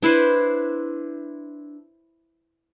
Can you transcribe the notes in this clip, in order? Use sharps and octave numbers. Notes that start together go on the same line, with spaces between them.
D4 E4 B4 C5